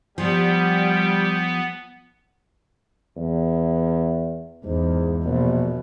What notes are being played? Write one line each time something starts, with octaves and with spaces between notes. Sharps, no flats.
F3 G3 B3 G5
E2
E2 G#2
A#1 B2